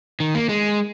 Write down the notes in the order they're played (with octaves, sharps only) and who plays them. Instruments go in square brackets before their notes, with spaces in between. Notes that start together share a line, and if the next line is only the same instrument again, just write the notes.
[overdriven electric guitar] D#3
A#3
G#3